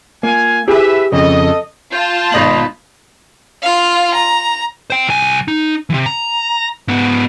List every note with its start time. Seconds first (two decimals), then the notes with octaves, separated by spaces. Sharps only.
0.23 A#3 F4 F5 G#5
0.68 E4 G4 G#4 B4 E5
1.12 F2 C#3 A4 D#5
1.92 F4 A5 G6
2.32 G#1 B2 D#4 D#5 B5 F#7
3.62 F4 F5
4.14 A#5
4.90 C5 G5
5.07 C2 G#5
5.48 D#4
5.90 C3 E3
6.06 A#5
6.88 G#2 B3